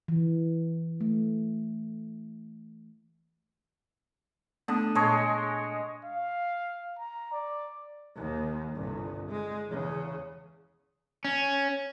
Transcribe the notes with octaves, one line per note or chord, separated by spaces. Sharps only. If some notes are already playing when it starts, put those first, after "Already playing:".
E3
A3
D3 A3 B3 D#6
A#2 G#3 C#5 D#5 A5 G#6
F5
A#5
D5
D#2 D#3
G1 C2
G#3
E2 C#3
C#4